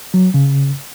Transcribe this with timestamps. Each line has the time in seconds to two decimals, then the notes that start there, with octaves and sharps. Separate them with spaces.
0.14 F#3
0.34 C#3